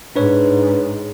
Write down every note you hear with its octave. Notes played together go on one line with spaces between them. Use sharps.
G#2 D4 B4 C#5